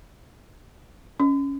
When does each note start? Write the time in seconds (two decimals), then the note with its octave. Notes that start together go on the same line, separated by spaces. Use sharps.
1.20 C#4